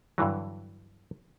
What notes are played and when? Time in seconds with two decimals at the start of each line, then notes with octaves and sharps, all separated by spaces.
0.18 G2 D3 E3 F#3